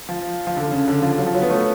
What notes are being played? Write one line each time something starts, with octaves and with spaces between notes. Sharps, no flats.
F3
F3
D3
C#3
D3
F3
F#3
F3
F#3
B3
A3